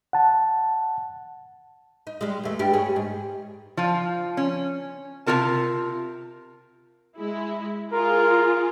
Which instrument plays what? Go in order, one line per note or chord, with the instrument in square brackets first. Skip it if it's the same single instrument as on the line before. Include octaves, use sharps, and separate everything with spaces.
[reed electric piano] F#5 A5
[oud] D#4
G3 G#3
E2 A3
G2 G3 G4
G#4 C#5
G#2
[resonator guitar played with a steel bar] F3 F4
C#4
C3 C#4 F4 A#4 A5
[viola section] G#3 E4
[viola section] F4 G#4 [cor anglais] A#4